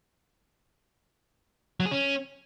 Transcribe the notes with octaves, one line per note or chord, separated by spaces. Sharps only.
F#3
G#4
C#4